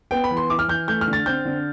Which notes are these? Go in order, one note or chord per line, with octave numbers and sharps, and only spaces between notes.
B3 G5
B5
E3
C6
E4 D6
F6
E3 G6
A3 G6
F6
D3
A6
C4 G6
D3